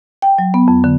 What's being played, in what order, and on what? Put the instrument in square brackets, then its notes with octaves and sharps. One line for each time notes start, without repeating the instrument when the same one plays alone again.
[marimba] G5
F#3
B3
F2
D3